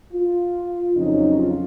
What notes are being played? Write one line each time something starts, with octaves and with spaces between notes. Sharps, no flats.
F4
F2 C#3 F#3 C#4 D#4
F4